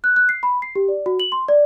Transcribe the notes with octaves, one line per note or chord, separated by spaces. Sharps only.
F#6
F#6
C7
B5
C7
G4
D5
F#4
F#7
C6
D5